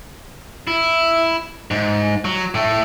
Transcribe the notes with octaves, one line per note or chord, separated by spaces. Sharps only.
E4
G#2
F#3
A2 A3